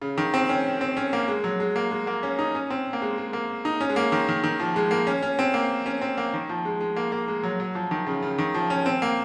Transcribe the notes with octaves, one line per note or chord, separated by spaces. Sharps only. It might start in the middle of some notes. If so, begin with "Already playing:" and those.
C#3
D#3
C4
C#4
C4
C#4
A#3
G#3
F#3
G#3
A#3
G#3
A#3
C#4
D#4
C#4
C4
A#3
G#3
G#3
A#3
D#4
C#4
G#3
A#3
D#3
D#3
D#3
F3
G#3
A#3
C#4
C#4
C4
A#3
C#4
C4
A#3
D#3
F3
G#3
G#3
A#3
A#3
G#3
F#3
F#3
F3
D#3
C#3
C#3
D#3
F3
C#4
C4
A#3